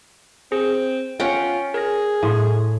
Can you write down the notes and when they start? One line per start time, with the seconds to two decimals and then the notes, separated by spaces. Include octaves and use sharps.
0.52 C4 G#4
1.20 C#4 F4 F#5 G5
1.74 G#4 A#4 A#6
2.23 A2 G#5 C6